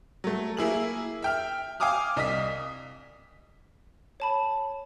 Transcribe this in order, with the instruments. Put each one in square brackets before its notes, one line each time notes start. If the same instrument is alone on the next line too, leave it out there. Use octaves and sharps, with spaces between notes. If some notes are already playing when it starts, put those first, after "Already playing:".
[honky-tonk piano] F#3 A3
A#3 E4 G#4 F#7
E5 G5 F6
F5 G5 G#5 D6 D#6 F6
C2 D#5 D#6 B6
[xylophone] C#5 A5 B5